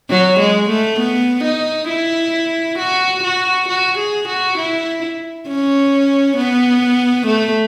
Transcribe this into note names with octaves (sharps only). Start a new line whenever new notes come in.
F#3
G#3
A3
B3
D#4
E4
F#4
F#4
F#4
G#4
F#4
E4
C#4
B3
A3